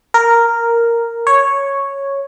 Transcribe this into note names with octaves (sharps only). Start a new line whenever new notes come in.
A#4
C#5